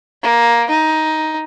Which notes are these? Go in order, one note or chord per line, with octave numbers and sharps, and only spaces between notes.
A#3
D#4